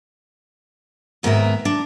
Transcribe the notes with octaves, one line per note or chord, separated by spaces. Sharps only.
D#2 G#2 B3 C4 A#4 E5
D4